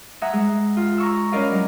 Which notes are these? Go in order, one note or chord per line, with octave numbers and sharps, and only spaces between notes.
E5 F#5 G#5 A#5 D#6
G#3
F4
A#5 C#6 E6
C#4 E4 A#4 D5 D#5 F5
F#3